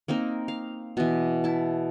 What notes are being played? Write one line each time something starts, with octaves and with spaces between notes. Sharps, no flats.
A#3 C4 D#4 A#4
F5
B2 E3
E4 A5